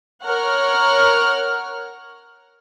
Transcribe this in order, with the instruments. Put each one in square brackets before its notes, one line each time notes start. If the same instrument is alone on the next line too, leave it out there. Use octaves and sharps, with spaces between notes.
[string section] A#4 C#5 F#5 F6